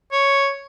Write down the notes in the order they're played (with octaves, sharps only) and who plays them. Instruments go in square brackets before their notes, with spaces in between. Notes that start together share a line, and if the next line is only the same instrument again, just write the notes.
[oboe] C#5